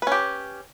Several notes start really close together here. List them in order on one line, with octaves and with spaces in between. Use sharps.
B4 C#4 G4